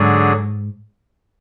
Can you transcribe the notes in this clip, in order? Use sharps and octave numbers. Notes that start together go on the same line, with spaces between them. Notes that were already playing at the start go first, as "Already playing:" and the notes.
Already playing: G#2 D3 F#3 D4 G#4